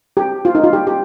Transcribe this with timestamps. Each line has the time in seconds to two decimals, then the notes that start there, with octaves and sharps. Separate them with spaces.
0.17 G4
0.45 F4
0.55 D#4
0.64 F4
0.73 G4
0.87 G4